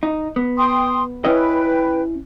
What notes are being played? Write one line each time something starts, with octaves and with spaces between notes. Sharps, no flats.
D#4
B3
G5 C6 D#6
C#4 E4 B4 D#5 G5